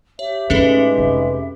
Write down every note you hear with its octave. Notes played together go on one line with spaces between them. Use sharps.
G4 C#5 E5
A2 G#3 C#4 D#4 G#4 A4 B4
F1